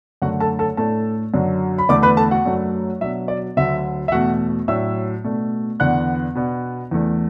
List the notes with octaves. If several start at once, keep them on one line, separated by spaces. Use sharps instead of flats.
F#2 D3 A3 D4 F#4 F#5
A4 A5
A4 A5
A2 A3 D4 A4 A5
F#2 D3 F#3 D4
B5
E2 D3 A3 D4 D5 D6
B4 B5
A4 A5
F#4 F#5
F#2 F#3 A3 D4
B2 F#3 D4 E5
D5
D2 D3 F#3 E5
E5
E2 B2 A3 F#4 F#5
A2 F#3 D4 E5 E6
B2 A3 D4
E2 D3 B3 D4 F#5 F#6
B2 B3 D4
E2 E3 A3 D4